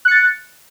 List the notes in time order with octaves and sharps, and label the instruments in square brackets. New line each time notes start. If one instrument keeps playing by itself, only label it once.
[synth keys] F#6
C#7
A6